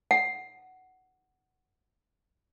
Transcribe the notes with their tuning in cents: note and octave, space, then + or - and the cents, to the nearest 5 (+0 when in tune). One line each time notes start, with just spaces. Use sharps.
F#5 +5